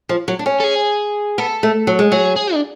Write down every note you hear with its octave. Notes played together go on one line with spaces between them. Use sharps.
F3
F#3
D4
C#4
A4
G#4
B3 A4
A3
F#3
G#3
F#3 G#4
G#4
D4